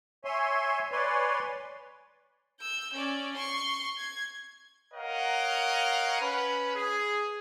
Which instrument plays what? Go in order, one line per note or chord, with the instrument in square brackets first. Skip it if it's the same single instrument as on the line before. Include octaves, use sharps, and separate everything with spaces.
[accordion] C#5 E5 G#5 C6
B4 C#5 D5 G#5 C6
[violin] E6 G6
C#4 D5
C6 C#6
G#6
[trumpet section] A#4 C#5 D#5 F5 F#5
C#4 B4
G#4